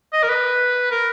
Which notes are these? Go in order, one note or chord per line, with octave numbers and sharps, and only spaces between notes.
D#5
A#4
B4
A#4